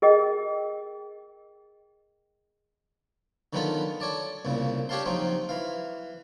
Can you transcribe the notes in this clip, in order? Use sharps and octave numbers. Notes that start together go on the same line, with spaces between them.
G#4 A#4 D#5 G5
D3 D#3 F#3 B3 F4 A4
A4 C#5 D5 A5
C2 A#2 C#3
D4 G4 C#5 F5 A5 C6
F3 F#3 C4 D#4
E3 F5